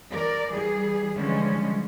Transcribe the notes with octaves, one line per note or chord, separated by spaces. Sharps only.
E3 A#4 D5
E3 G3 G#4
D3 E3 F3 G3 G#3 C#4